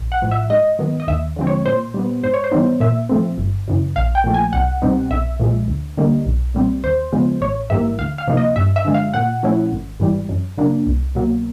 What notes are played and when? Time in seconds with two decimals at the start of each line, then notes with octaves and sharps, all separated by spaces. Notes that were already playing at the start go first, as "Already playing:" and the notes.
Already playing: A#1
0.12 F#5
0.22 A2 F3
0.31 E5
0.50 G#2 D#5
0.79 D#3 F#3 B3
1.00 D#5
1.07 D#2 E5
1.36 D3 F3 G#3 C4
1.47 C#5
1.66 A#2 C5
1.94 G3 B3
2.23 G#2 C5
2.34 C#5
2.44 C5
2.52 E3 G3 B3 D#4
2.80 A#2 E5
3.09 F3 A3 C4
3.38 G1
3.68 F#2 C#3 E3
3.96 A#1 F5
4.15 G5
4.24 A#2 F3 A3
4.34 G#5
4.53 C2 F#5
4.82 B2 G3 C4 D#4
5.10 B1 E5
5.40 A#2 F3 G#3
5.68 D2
5.97 D3 G3 A#3 D#4
6.26 B1
6.54 A#2 G3 C4
6.84 D#2 C5
7.12 C#3 F3 G#3 B3
7.41 A1 C#5
7.70 G#2 E3 G3 A#3 E5
7.99 D2 F5
8.18 F5
8.28 C3 F3 A#3 D#4
8.37 D#5
8.56 G2 E5
8.76 E5
8.85 D3 F3 G#3
8.94 F5
9.14 A#2 F#5
9.43 F3 A3 C#4 E4
9.71 G#1
10.00 G#2 E3 G3
10.29 F#2
10.58 C#3 F#3 A#3 D4
10.86 C2
11.15 B2 F#3 A#3